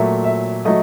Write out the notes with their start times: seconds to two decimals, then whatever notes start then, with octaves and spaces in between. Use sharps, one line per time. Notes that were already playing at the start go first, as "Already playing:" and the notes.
Already playing: A#2 F#3 A3 E5
0.24 E5
0.65 F#3 A3 D#5